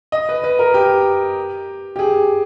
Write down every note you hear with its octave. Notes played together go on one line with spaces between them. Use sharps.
D#5
B4
B4
A#4
G4
G4
G#4